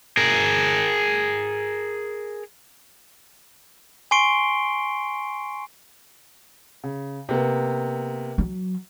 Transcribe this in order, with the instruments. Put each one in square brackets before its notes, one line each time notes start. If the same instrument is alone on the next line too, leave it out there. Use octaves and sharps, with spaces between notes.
[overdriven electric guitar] G#4 A#4
[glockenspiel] G#5 C6 C#6 C7 D7 G7
[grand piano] C#3
C3 A#3 B3
[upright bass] F#3